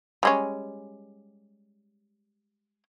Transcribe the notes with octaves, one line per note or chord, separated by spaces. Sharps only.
G3 G#3 C#4